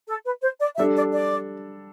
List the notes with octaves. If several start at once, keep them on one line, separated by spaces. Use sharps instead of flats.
A4
B4
C5
D5
G3 D4 A4 E5
D5
D5